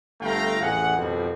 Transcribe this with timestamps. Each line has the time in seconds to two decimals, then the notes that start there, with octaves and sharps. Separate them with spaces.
0.21 G1 A3 F4 F5 G5 A#5
0.61 A1 F2 G#4 F#5
0.97 F2 B2 D#3 G3 C4